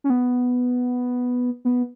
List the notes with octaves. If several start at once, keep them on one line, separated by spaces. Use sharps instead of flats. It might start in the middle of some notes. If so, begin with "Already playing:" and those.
C#4
B3
B3